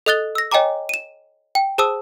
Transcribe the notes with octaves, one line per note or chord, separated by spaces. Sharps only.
A4 D#5 D#6 F#6 A6 G7
E6 A#6
C#5 D#5 G5 G#5 A#5 D6
D#7 E7
G5
G#4 C5 A5 D#6 E6